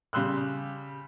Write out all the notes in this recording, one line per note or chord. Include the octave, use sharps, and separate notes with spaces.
C#3 G3 C6 E6 F#6